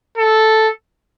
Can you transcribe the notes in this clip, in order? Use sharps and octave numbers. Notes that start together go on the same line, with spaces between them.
A4